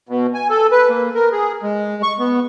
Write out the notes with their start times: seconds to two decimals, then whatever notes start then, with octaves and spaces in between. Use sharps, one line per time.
0.09 B2
0.34 G#5
0.50 A4
0.71 B4
0.89 A#3
1.15 A#4
1.32 G#4
1.63 G#3
2.03 C#6
2.19 B3